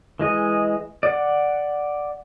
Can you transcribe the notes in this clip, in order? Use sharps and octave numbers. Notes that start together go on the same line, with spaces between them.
E3 G#3 D#5
D5 F#5